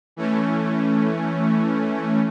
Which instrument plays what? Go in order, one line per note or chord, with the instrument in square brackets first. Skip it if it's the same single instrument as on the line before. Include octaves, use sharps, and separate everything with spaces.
[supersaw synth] E3 A3 C#4